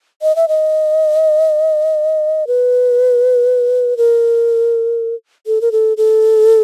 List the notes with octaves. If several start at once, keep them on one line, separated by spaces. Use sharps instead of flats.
D#5
E5
D#5
B4
A#4
A4
A#4
A4
A4